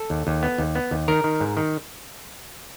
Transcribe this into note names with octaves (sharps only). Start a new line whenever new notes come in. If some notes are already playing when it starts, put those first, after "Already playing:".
Already playing: A4
D#2
D#2
B3
D#2
B3
D#2
D#3 A#4
D#3
G#2
D#3